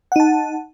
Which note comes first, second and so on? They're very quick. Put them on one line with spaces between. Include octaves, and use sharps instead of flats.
F#5 D#4 A5